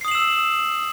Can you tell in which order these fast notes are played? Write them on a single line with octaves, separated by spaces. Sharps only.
C7 D#6 F#7 E7 E6